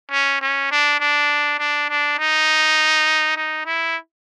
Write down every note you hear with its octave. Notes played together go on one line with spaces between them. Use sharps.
C#4
C#4
D4
D4
D4
D4
D#4
D#4
E4